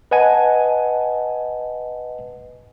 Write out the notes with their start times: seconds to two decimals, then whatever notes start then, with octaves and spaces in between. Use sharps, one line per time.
0.11 B4 D#5 F#5 G#5 A5